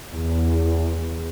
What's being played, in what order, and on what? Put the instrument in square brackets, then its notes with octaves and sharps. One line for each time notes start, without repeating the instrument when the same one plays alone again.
[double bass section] E2